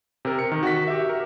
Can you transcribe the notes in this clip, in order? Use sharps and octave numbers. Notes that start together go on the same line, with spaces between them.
C3 A#4
C#7
D#3
F#4 B6
G4 E5
A#4